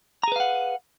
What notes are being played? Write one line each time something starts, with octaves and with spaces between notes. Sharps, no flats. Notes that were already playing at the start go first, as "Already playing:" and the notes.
G#4 B4 F5 F#5 A#5